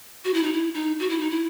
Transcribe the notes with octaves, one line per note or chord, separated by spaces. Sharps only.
F#4
E4
D#4
E4
D#4
F#4
E4
D#4
E4